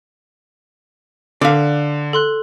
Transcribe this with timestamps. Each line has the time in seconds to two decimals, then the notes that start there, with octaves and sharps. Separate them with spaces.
1.41 D3 D5 F5
2.13 A4 C6 F#6